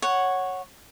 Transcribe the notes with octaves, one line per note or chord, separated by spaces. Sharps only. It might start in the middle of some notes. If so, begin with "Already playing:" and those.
C#5 F#5